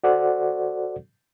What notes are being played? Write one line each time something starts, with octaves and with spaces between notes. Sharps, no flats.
F#4 A4 C5 D5 F#5